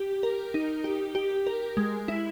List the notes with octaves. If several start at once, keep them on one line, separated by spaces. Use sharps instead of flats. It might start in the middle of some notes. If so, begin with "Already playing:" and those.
Already playing: G4
A#4
D#4
G4
G4
A#4
G#3
E4